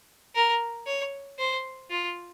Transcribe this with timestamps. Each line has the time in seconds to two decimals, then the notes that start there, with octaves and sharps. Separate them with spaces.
0.35 A#4
0.87 C#5
1.39 C5
1.90 F4